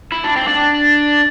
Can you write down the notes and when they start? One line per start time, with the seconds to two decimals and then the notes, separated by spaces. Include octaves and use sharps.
0.12 E4
0.24 D4
0.36 C4
0.48 D4